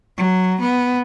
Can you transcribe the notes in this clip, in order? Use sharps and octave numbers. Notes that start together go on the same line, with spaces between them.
F#3
B3